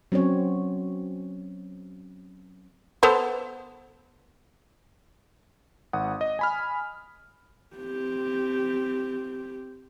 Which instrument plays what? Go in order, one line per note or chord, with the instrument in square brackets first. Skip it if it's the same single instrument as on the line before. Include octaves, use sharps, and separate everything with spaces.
[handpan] F#3 C4 C#4 C#5
[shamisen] B3 A4 C5
[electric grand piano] G#1 F#5 D#6
D#5
G#5 B5 F6
[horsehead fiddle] C4 G4